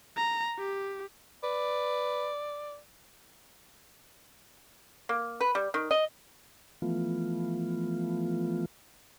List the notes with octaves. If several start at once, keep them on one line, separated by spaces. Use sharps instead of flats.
A#5
G4
B4 D5
A#3
B4
G3
D#3
D#5
E3 F3 A3 B3 F4